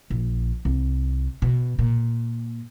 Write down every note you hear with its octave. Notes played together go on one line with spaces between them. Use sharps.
A#1
C2
B2
A#2